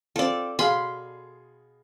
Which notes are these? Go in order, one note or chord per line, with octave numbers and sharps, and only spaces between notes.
C4 F4 A4 D5
B2 G#4 F5 B5 C6